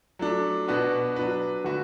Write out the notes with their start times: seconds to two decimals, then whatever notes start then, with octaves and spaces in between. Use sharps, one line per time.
0.19 F#3 A3 D4
0.68 B2 B3 D4 F#4 B4
1.16 F#3 D4 B4
1.64 D3 A3 F#4 B4